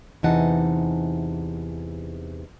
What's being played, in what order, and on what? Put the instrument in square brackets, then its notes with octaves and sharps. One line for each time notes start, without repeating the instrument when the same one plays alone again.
[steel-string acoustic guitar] E2 C3 E3 D#4 F#5 A5